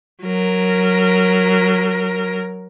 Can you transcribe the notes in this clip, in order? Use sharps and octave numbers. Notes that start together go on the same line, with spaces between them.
F#3 A#4